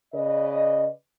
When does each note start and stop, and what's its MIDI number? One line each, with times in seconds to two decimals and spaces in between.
0.13 0.88 49
0.13 0.88 71
0.13 0.88 74
0.13 0.88 75